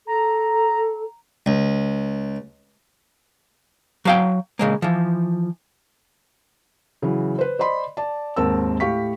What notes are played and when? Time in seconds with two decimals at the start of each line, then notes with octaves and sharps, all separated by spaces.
0.07 A4 A#5
1.46 C#2
4.05 F#3 F5 G5
4.59 C#3 G#3 A#3
4.82 E3 F3
7.02 C#3 E3 F#3
7.39 B4 C5
7.59 C5 D5 D#5 B5 C6
7.97 D5 A5
8.36 D#2 G#2 C4 A#4 A5 E6
8.80 A2 G4 F5 C#6 B6